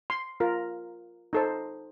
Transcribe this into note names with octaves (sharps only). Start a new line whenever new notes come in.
C6
F4 A#4
D#4 A4 C5